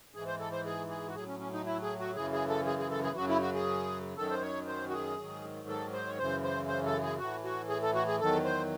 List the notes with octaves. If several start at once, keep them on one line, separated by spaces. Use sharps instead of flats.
G#2 E3 G#4
C5
A4
C5
G#4
G#4
F#4
A2 F#3 G#4
C#4
C#4
D#4
E4
G#4
F#4
F#2 C#3 E3 G#4
G#4
A4
G#4
G#4
A4
G#4
F#2 C#3 F#3 F#4
E4
F#4
G#4
F#2 D#3 F#3 A4
C5
C#5
C5
F#4
G#4
G#2 D#3 F#3
A4
C5
C#5
F#2 C#3 E3 C5
C5
C5
A4
G#4
A2 E3 F#4
F#4
G#4
A4
F#4
G#4
E2 D#3 F#3 A4
C5